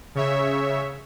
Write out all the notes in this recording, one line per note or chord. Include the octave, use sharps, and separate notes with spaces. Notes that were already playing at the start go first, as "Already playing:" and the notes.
C#3 C#5 E5